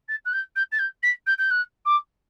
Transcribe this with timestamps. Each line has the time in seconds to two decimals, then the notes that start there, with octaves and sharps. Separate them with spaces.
0.08 A6
0.25 F#6
0.33 G6
0.56 G6
0.72 A6
0.79 G6
1.03 B6
1.26 G6
1.38 G6
1.50 F#6
1.85 D6